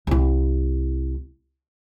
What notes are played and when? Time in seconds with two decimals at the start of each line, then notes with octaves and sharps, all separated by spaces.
0.07 C2 E4